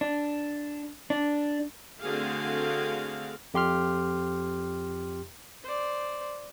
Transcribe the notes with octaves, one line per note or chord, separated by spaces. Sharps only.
D4
D4
D3 A3 C4 F#4 G#4 F5
F2 G4 C6 F6
C5 D5